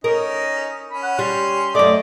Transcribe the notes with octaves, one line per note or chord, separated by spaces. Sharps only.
C#4 D#4 A#4 D#5
C#4 B5
F#5
G3 C6
F#2 A3 D5 D#5